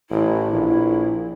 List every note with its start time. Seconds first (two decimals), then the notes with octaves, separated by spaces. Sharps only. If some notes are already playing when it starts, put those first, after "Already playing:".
0.10 A1 E4
0.51 A#1